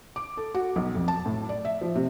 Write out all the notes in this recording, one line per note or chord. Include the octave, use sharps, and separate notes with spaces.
D6
A4
F#4
B1
F2
A5
A2
D5
E5
F3
C3